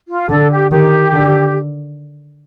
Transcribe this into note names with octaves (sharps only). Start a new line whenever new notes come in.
F4
D3 A4
G4
D#3 G4
D3